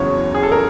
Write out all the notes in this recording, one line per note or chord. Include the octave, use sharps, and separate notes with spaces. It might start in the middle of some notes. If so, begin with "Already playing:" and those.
Already playing: F#1 E2 C#3 F#3 C#5
G#4
A4
A#4